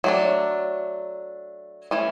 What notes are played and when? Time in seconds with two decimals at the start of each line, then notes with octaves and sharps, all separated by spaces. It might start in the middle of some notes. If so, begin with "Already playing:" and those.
0.04 F#3 A3 D4
1.91 E3 A3 C#4